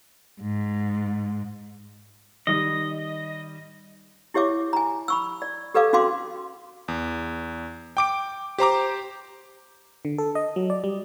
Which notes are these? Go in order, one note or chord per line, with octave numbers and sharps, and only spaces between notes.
G#2
D#3 G3 D#5
E4 G4 C#5 E5 D6
G#5 A#5
B5 C#6 E6
D5
G4 A4 B4 D5 F5 D6
C#4 F#4 F5 C6 D6
E2
G5 D6 D7
G4 C5 A#5 D6
D3
A4
D#5
F#3
D5
G3